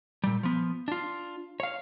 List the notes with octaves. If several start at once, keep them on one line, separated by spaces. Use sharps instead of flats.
A#2 G3
F3 B3
D4 F4
C#5 F5